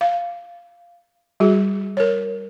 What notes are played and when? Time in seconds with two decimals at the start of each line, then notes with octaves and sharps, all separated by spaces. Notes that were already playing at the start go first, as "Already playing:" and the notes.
0.01 F5
1.40 G3 F#4 G#4
1.97 A#4 C#5